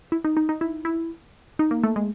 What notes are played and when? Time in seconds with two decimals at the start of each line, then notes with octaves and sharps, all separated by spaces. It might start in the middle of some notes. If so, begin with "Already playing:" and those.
0.12 E4
0.24 D#4
0.37 D#4
0.49 D#4
0.61 E4
0.85 E4
1.59 D#4
1.71 A#3
1.84 A3
1.96 G#3